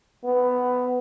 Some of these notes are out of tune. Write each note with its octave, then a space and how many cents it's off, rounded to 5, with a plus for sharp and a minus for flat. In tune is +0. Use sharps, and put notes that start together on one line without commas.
B3 +10